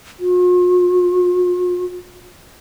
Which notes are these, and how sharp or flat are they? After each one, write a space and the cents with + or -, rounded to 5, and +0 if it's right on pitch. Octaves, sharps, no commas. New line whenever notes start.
F4 +45